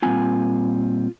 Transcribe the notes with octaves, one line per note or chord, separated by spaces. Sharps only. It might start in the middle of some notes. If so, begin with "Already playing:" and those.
A#2 G3 C4 F4 G#5